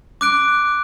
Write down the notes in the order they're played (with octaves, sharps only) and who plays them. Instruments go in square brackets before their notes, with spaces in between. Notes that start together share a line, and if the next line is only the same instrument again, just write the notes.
[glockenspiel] D6 F#6 D7